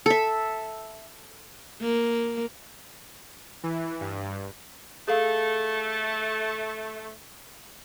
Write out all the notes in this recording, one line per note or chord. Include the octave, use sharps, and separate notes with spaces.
A4 E5
A#3
E3
G2
A3 G#4 A4 F5